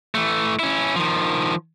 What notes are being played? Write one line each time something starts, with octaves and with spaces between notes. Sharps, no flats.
E3 A3
C#4 E4
D#3 F3